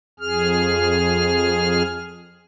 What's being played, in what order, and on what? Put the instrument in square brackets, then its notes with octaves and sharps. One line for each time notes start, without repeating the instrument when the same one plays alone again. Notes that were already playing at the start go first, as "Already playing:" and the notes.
[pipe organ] F2 G#4 F6